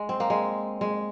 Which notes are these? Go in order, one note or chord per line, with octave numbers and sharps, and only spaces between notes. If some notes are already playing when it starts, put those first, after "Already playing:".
Already playing: G#3
C4
A#3
G#3
G#3